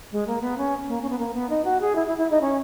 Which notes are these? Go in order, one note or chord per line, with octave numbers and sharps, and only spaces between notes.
G#3
A#3
B3
C#4
A#3
C#4
B3
A#3
B3
D#4
F#4
G#4
E4
E4
E4
D#4
C#4